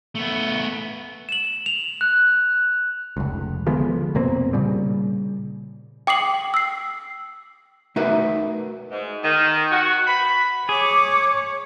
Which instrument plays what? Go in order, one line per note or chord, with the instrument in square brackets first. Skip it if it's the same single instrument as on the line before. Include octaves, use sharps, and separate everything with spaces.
[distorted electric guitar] A3 B3
[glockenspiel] E7 F#7
F7
F#6
[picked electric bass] F1 C#2
D3 F3 G#3 B3
F1 B2 A#3 C4
A#2 C#3 G3
[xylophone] G5 D6 D#6 C7 F#7
E6 C7
[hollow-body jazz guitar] A3 D#4 F#4 A#4 B4 E5
[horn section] G#2
D#3
F#4
B5
[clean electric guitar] G#4 [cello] C#5 [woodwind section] D6